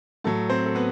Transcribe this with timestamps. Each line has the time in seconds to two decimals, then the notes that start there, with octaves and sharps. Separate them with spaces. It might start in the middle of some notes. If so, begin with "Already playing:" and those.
0.24 A2 F#3 A4 A5
0.50 C4 C5
0.66 A4
0.75 B3 B4